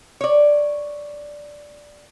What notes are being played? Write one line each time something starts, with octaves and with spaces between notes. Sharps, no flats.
C#5 D5